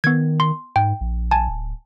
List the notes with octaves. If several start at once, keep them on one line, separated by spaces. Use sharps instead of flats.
D#3 B3 G#6
C6
G#2 G5
A#1
G#5 A5
D1